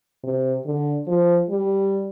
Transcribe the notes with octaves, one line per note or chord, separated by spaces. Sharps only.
C3
D3
F3
G3